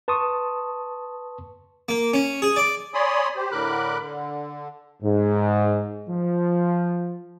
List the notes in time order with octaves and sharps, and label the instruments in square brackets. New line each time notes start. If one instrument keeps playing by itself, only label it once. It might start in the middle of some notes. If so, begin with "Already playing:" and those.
[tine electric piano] B4 A5 C6 C#6 D#6
[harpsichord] A#3
C#4
G#4
D5
[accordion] C#5 D5 G#5 B5 C6 D#6
G4 C5
A2 D3 A#4 B5 D6 F#6
D3
[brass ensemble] G#2
F3